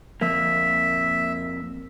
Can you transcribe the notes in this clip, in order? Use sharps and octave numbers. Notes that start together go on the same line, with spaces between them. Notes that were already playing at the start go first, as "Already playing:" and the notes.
F2 A#3 E5